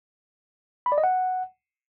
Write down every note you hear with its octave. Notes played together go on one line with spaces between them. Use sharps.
B5
D5
D#5
F#5